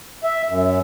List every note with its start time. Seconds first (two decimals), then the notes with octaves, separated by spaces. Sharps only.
0.24 E5
0.49 F#2